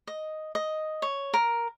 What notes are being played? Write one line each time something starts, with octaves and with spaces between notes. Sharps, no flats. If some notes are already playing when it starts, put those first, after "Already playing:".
D#5
D#5
C#5
A#4